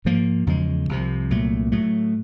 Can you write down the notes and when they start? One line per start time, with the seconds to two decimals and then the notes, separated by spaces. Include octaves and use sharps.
0.05 G#2 F3 A#3
0.47 E2 C#3 F3 G#3
0.89 C2 C3 F3
1.30 C2 A#2 F#3 A3
1.72 A2 F#3 A3